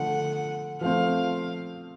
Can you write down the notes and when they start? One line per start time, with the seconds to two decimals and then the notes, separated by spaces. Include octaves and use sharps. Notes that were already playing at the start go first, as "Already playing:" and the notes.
Already playing: D3 F3 A3 F#5
0.81 F3 A3 C4 F5